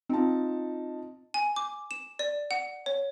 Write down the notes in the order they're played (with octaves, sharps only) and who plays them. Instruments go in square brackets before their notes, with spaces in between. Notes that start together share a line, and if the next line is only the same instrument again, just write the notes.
[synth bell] C4 [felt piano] D#4 F4 A5
[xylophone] G#5
D6
E7
D5
F#5
C#5